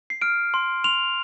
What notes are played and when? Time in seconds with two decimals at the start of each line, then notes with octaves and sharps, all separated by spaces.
0.10 C7
0.22 F6 D7
0.54 C6
0.84 C6 F7